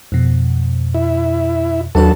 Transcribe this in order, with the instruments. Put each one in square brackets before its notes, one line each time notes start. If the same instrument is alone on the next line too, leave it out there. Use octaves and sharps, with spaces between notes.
[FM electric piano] F2 B2
[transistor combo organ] E4
[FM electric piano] D#2 D4 B4 [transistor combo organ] F#3 A4